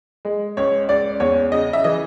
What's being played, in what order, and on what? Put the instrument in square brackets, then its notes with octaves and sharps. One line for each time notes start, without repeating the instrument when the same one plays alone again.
[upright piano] G#3
C#2 C#5
C#2 D5
E2 C#5
C#3 D#5
E5
E3 D#5